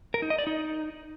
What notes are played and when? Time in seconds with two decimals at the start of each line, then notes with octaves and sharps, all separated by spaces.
0.14 A#4
0.22 D#4
0.30 D#5
0.39 D5
0.47 D#4